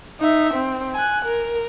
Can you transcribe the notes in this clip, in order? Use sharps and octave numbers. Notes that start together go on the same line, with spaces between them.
D#4 E5
C4
G#5 F#6
A#4